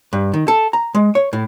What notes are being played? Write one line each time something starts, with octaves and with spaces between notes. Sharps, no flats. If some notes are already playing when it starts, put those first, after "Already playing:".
G2
D#3
A4
A#5
G#3
C#5
A2